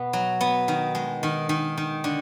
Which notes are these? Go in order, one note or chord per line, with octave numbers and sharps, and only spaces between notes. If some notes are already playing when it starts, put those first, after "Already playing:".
Already playing: B2 B3
F#3
B3
D#3
G#3
D#3
D#3
D#3
D3